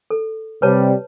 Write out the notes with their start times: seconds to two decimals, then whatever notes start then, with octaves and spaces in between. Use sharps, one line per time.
0.10 A4
0.62 C3 G3 B4 C#5 A5